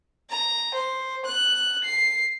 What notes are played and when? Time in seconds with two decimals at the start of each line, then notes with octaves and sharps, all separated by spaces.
0.30 A#5
0.75 C5
1.25 F#6
1.84 C7